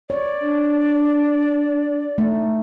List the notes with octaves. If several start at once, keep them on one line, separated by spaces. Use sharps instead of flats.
C#5 D5
D4
A3 D#4